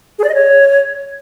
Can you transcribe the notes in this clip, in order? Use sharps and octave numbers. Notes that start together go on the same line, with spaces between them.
G#4
D5
D#5
C#5